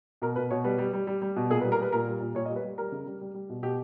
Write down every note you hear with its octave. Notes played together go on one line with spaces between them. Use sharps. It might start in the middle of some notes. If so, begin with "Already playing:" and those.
B2 A#4
B2 B4
B2 C#5
G3 B4
G3
G3
G3
G3
B2
A#2 G#4
B4
G3
A#4
G3 B4
A#2 A#4
G3
A#2
A#2 C#5
D#5
G3
B4
G3
G3 A#4
C#3
G3
G3
G3
B2
B2 G4